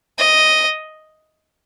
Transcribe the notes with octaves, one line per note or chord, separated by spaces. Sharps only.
D#5